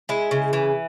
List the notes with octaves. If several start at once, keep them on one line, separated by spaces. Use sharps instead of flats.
G#3 E4
C#3
E3